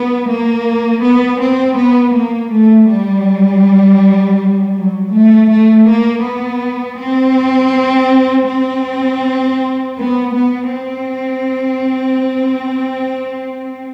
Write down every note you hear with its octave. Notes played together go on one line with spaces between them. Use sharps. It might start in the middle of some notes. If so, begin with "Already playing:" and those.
Already playing: B3
A#3
B3
C4
B3
A#3
A3
G3
F#3
A3
A3
A#3
B3
C4
C4
B3
B3
C4